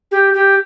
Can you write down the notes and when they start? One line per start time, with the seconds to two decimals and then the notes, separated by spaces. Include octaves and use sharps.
0.11 G4
0.33 G4